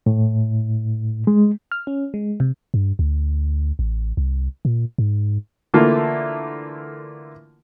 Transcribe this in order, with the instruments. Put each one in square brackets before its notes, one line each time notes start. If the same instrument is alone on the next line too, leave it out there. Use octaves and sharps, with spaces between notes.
[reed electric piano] A2
G#3
[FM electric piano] F6
C#4
G#3
C3
[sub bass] G2
D2
A1
C2
A#2
G#2
[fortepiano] D3 E3 A3 A#3 E4 F4